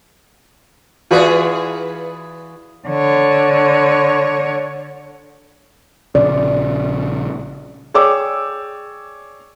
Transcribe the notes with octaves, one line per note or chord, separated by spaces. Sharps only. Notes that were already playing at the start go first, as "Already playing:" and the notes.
E3 F4 F#4 G#4 B4 D5
D3 C#5
A#1 C#3 D5
G#4 C#5 D5 G5 D6 E6